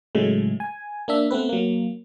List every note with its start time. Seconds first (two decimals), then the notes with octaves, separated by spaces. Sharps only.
0.15 A2 C#3 F#3 G#3 A3
0.60 G#5
1.08 A#3 D4 E5
1.31 A3 B3 C4 B4
1.49 F#3 A#3